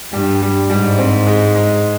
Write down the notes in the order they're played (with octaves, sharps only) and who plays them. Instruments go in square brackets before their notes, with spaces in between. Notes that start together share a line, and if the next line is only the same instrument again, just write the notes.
[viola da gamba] G2 [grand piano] G3
[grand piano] G3
[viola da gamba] G#2 [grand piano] G3
[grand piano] C4
G#3
G#3